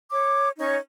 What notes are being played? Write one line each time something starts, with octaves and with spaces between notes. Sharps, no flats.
C#5 D6
C#4 D#4 C#5 C#6